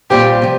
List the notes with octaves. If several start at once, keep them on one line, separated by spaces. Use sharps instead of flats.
A#2 G3 C4 F4 G4 C5
C3 F3